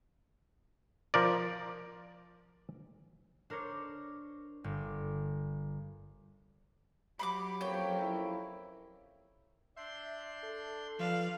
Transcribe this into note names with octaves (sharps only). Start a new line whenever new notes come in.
F3 A#4 D5
D4 A#4 C5 C#5
G1
F#3 G4 B5 C6 D6
F2 A#3 C#4 C#5 G5
E4
D4 E5 C6 G6
A4
F3 D4 B4 D5 F5